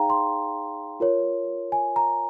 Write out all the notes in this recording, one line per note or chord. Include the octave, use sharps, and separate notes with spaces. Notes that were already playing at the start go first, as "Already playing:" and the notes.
Already playing: D#4 G#4 C#5 F5 G5 A#5
C6
F4 A#4 C#5
G#5
A#5